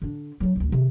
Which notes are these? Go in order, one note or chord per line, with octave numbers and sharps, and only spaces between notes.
D3 D4
F#3 D4
A1 D2
C3 D#3